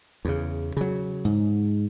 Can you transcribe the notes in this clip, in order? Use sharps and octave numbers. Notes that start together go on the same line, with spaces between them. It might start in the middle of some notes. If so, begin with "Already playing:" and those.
E2 C#3
C#3 F#3
G#2